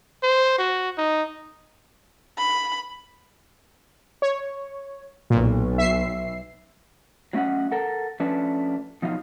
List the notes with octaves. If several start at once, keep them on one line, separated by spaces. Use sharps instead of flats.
C5
F#4
D#4
B5
C#5
B1 A#2
E5 C7
F#3 A3 C#4 D#5 F#5
A4 A#4 F#5
F3 A3 C#4 D4 B4
B2 F3 F#3 D#4 F5